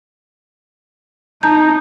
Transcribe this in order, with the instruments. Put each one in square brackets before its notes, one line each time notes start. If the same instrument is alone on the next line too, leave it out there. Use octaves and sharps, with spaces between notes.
[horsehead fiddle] D#4 [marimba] A5 A#5 G6